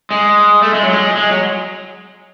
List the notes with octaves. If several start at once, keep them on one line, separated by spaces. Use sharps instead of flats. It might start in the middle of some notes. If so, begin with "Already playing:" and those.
G#3
A3
G#3
F#3
G#3
G#3
F#3